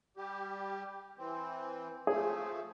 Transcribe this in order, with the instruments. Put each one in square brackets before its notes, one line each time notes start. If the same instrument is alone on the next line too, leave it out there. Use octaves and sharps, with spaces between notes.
[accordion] G3 G4
E3 C4
[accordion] F3 A3 [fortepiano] G#4